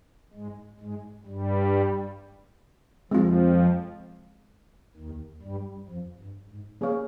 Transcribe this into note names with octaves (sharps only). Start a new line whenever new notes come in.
G#2 G#3
G#2 G#3
G2 G3
F2 F3 G#3 C4 F4
D#2 D#3
G2 G3
F2 F3
G2
G#2
A#3 C#4 G#4 C#5 F5